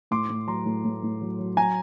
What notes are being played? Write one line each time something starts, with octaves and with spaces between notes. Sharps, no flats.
A2 C6 D6
A2
F#3 A#5 C6
A2
A2
A2
F#3
F#3
F#3 G#5 A#5